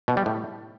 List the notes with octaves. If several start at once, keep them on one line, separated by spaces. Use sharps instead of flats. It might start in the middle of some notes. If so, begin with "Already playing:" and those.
B2
G3
A2